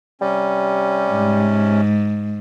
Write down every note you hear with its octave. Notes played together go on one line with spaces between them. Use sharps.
C3 G3 C#4
G#2